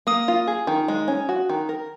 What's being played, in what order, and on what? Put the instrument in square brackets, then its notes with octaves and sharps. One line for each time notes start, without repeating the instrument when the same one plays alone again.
[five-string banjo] A#3 [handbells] D#6
[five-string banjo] F4
G#4
D#3
G#3
C#4
F#4
D#3
A#4